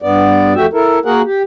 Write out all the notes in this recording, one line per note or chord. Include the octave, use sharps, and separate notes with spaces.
G2 B3 D5
F2 A3 F#4 G4 E5
E4 A4 A#4
A#3 F#4 G#4 A#4 F#5
G4